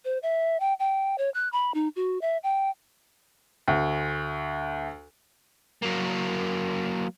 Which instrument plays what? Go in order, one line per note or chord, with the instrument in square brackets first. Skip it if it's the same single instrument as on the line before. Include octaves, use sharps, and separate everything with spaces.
[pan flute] C5
E5
G5
G5
C#5
F#6
B5
D#4
F#4
E5
G5
[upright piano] D2
[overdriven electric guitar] F#3 A#3